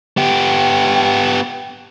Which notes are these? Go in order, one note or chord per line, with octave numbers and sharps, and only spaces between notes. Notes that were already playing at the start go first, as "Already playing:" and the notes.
B3 G4